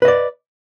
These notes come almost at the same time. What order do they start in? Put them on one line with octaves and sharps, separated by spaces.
B4 D#5 D5